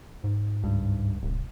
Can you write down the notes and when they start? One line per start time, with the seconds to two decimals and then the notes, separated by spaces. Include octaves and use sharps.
0.24 G#2
0.64 C#2 G2
1.23 D1 C2